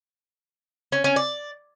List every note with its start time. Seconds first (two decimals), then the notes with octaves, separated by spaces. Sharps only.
0.92 C#4
1.04 C#4
1.16 D5